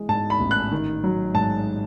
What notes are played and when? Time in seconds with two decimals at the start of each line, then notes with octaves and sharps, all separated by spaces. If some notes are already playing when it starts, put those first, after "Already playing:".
Already playing: E3 G#3
0.08 G#2 A5
0.30 B5
0.40 A1
0.51 F#6
0.71 D#3
1.04 F#3
1.34 G#2 A5